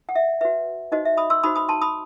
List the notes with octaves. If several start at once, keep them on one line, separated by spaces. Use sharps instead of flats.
F#5
E5
F#4 B4 E5
D#4 F#4 C5 D#5
E5
B5 D#6
C6 E6
D#4 F#4 C5 B5 D#6
B5 D#6
A5 C6
B5 D#6